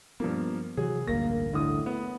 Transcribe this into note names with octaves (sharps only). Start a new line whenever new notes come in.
G2 F3 A#3 B3
C3 E3 F#3 G#4
A1 D2 G2 A#3 A#6
A2 D3 D#6
B3